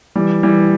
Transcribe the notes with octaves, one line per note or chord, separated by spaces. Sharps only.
E3 G3
E3 G3